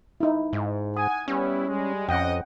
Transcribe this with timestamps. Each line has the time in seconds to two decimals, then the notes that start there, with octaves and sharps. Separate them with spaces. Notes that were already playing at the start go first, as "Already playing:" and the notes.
0.20 D#4 E4
0.53 G#2
0.97 F#5 G#5 D#6
1.28 G3 B3 C#4 E4
1.68 G3 G#3
2.09 F2 C#4 D#5 F#5 G5